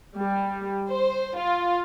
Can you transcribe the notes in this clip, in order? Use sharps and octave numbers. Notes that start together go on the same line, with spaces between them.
G3
C5
F4